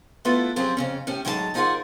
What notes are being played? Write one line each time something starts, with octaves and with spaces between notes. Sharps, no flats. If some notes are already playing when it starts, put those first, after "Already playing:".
A3 B3 E4 F4 A4 B4
F3 F#3 C4 C#4 G4 G#4
F2 C#3 C#4
A2 C#4 G4
A2 F#3 G#3 D#4 C5 A5
F3 D#4 F4 G#4 A#4 F#5